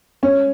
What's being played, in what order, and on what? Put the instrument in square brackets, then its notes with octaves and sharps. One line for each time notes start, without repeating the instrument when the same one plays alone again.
[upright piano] C#4